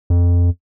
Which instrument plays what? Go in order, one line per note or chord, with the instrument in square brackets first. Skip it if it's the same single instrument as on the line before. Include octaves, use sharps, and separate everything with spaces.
[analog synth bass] F2